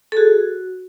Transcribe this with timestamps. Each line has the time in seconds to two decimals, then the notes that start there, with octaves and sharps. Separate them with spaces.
0.12 A4
0.17 F#4 G#4